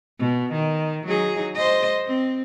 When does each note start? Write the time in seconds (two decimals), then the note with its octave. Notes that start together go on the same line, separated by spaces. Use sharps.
0.19 B2
0.52 D#3
1.06 F#3 D#4 G#4
1.55 C5 D#5
2.06 C4